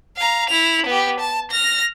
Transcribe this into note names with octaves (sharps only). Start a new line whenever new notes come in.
F5 A#5
E4 F7
B3 G4
A5
F6 A#6